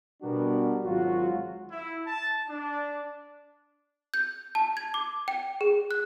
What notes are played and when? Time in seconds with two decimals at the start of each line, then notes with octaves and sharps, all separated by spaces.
0.23 B2 G3 B3 D4 F#4 A#4
0.85 G#1 F#3 F4 F#4
1.71 E4
2.07 A5
2.49 D4
4.14 G6
4.55 A5
4.77 G#6
4.94 D6
5.28 G5
5.61 G#4
5.91 F#6